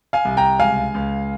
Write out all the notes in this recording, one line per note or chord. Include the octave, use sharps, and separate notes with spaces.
F5 G#5
C2
G5 A#5
C#2 F5 G#5
C#2